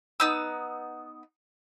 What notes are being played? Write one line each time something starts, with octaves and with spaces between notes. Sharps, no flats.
B3 D#4 E6